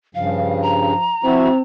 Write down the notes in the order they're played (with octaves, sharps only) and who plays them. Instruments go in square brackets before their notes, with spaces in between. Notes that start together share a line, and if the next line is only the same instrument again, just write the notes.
[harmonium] G2 C#3 [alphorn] F3 [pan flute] F5
[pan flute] A#5
[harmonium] F3 E4 F#4 [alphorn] C4